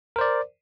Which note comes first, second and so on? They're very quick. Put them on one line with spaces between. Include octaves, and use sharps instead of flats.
A#4 C5 D5